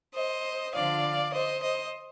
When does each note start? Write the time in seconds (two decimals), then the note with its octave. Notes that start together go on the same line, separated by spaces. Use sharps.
0.13 C5 D#5
0.73 D3 F3 D5 F5
1.32 C5 D#5
1.62 C5 D#5